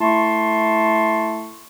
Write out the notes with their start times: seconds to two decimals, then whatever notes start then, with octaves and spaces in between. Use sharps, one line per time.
0.01 A3 E4 A5 C6 C#6